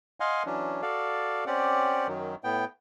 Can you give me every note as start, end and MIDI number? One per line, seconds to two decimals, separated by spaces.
0.20 0.43 75
0.20 0.43 77
0.20 0.43 78
0.20 0.43 80
0.20 0.43 84
0.46 0.81 52
0.46 0.81 54
0.46 0.81 61
0.46 0.81 62
0.82 1.44 66
0.82 1.44 69
0.82 1.44 74
0.82 1.44 77
1.47 2.07 60
1.47 2.07 61
1.47 2.07 67
1.47 2.07 74
1.47 2.07 78
2.08 2.35 42
2.08 2.35 51
2.08 2.35 54
2.44 2.65 45
2.44 2.65 59
2.44 2.65 79